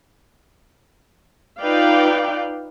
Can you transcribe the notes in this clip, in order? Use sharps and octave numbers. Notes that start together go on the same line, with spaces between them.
D#4 F4 B4 D5 F5 G5